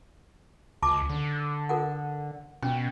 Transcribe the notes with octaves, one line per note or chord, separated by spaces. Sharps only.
C#2 A5 D6
D3
A4 A#4 F#5
B2 C#4 G5